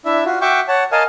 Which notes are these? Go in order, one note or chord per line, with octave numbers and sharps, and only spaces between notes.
D4 E4 E5
F4 F#4
F#4 E5 G5 C#6 D6
C#5 F#5 A5
A#4 D#5 F5 G#5 A5